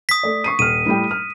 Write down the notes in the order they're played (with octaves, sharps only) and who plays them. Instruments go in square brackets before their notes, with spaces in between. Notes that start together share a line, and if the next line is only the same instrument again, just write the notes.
[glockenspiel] D#6 B6
[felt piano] A3 D5
C#6 C7 D#7
[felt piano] D#1 F6 [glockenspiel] D#7
[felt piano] A2 G3 G5
F6